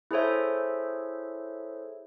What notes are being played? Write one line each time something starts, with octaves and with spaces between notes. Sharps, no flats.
E4 G#4 A4 C5 C#5 E5